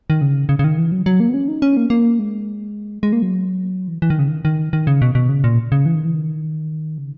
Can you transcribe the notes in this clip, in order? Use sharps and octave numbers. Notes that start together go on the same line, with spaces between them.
D#3
C#3
C#3
C#3
D#3
E3
F#3
F#3
A#3
B3
C#4
D#4
C#4
A#3
A#3
G#3
G#3
A#3
F#3
E3
E3
D#3
C#3
D#3
D#3
D#3
C#3
B2
B2
C#3
A#2
C#3
E3
D#3
E3
D#3
C#3